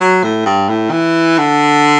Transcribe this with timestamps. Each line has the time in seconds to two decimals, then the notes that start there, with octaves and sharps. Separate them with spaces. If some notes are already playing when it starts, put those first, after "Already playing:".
0.01 F#3
0.24 A2
0.46 G2
0.69 A2
0.91 E3
1.38 D3